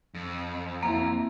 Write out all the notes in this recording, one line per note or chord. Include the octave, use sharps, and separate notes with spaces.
F2
A#3 C4 E4 A#5